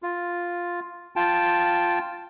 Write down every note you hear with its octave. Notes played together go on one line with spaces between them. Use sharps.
F4
F4 G5 A5